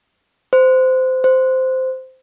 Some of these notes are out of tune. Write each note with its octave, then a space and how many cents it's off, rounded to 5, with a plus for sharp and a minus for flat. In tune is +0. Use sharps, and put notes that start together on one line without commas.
C5 -20
C5 -10